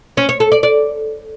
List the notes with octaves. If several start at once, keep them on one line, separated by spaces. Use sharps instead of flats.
C#4
C#5
A4
D5
D5